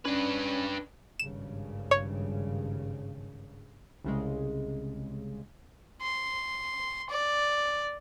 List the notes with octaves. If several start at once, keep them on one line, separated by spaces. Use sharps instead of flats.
C#4 D4 B4
G#1 G2 C#3 E7
C#5
C2 C#3 G#3
C6
D5